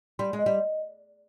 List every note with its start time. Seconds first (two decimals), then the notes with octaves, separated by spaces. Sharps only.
0.19 G3 C6
0.33 G#3
0.39 D#5
0.46 G3